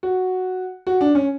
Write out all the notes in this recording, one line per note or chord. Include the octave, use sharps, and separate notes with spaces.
F#4
F#4
D4
C#4